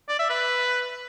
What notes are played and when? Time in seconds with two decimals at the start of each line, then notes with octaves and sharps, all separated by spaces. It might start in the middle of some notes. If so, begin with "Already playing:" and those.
0.08 D5
0.19 E5
0.30 B4